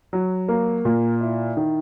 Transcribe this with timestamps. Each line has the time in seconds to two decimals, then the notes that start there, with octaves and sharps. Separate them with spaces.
0.13 F#3
0.49 A#3
0.85 A#2
1.21 E4
1.57 D#3